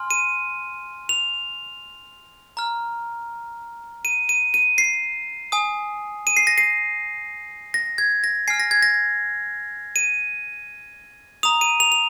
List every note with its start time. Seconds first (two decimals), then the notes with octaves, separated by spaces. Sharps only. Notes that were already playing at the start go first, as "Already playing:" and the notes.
Already playing: G#5 C6 F6
0.11 D#7
1.09 F7
2.57 A#5 F6
4.05 D#7
4.29 D#7
4.54 D#7
4.78 C7
5.52 G#5 D#6
6.27 D#7
6.37 C7
6.47 A#6
6.58 C7
7.74 A#6
7.98 G#6
8.24 A#6
8.48 G#5 F6 C7
8.60 A#6
8.71 G#6
8.83 A#6
9.96 D#7
11.43 A#5 D#6 F7
11.61 D#7
11.80 F7
11.92 F7